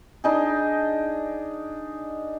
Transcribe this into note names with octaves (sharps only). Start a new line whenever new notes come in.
D4 D#4 G#4